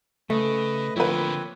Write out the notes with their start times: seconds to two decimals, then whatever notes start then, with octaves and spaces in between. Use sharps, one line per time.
0.30 C#3 A3 B4 D#5
0.96 D3 F3 A#3 C4 E4 B4 C#5